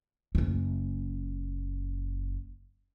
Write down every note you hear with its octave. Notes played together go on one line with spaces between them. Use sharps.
F#1 C#4